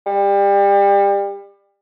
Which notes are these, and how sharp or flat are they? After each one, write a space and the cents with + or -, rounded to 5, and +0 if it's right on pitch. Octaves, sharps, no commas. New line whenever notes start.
G3 +30